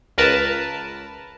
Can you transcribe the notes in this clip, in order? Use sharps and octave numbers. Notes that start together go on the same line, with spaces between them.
C#2 A#4 B4 A5